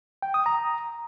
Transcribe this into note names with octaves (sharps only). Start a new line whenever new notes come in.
G5
D#6
A#5